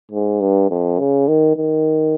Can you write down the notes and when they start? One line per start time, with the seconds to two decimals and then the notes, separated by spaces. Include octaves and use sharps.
0.11 G#2
0.40 G2
0.70 F2
0.99 C#3
1.28 D#3
1.56 D#3